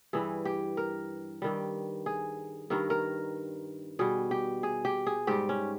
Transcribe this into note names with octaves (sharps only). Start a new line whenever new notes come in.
G2 E3 G3 G#4
G4
A#4
G2 D#3 G3
G#4
G2 D#3 G3 A#4
A#4
B2 G3 G#4
G4
G#4
G4
G#4
G#2 G3 G4
C#4